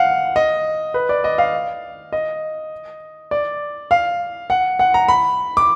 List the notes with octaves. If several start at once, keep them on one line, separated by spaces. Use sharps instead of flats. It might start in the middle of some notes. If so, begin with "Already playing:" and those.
Already playing: F5 F#5
D#5
B4
D5
D#5
F5
D#5
D5
F5
F#5
F#5
A#5
B5
D6